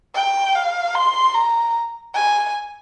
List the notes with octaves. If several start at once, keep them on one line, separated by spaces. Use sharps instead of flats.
G5
F5
C6
A#5
G#5